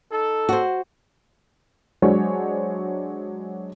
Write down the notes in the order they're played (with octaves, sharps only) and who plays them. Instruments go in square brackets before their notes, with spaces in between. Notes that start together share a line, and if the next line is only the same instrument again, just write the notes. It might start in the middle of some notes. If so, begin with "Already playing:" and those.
[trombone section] D#4 A4
[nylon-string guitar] F#4 C5
[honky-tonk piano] F#3 G#3 D4 G#4 C5 C#5